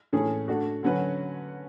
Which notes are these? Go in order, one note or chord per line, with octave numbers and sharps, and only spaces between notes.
A2 E3 A3 C#4 G#4
A3 D4 F#4
D3 F#3 C#4 F#4 B4